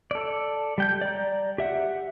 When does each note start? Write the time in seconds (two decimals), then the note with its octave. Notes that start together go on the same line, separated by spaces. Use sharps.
0.11 A4 D5
0.78 G3 G5 G6
1.01 D5 A#5
1.58 G4 E5 F#5